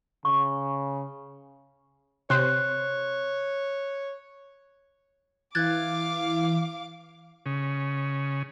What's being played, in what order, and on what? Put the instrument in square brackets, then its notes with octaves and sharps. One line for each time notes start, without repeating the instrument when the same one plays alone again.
[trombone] C#3 [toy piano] C#6
[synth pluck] C3 C5 [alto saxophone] C#5 [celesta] F#6
[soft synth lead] E3 [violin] F5 D6 [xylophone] F#6 G#6 A6
[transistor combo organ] C#3